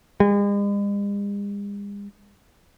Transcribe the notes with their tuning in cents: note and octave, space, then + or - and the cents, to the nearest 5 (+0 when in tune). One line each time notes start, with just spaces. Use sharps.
G#3 -45